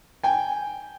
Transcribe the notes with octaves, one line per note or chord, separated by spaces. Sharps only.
G5 G#5